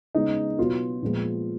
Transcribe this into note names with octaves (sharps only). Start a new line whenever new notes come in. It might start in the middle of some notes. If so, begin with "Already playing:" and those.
C#3 G#3 B3 D#4
B2 F#3 B3 F4
A#2 F3 G#3 B3